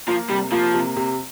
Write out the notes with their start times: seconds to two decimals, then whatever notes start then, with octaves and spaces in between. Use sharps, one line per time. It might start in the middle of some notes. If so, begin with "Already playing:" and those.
0.08 F3 A#3
0.30 C3 G3
0.52 F3 A#3
0.74 C3
0.97 C3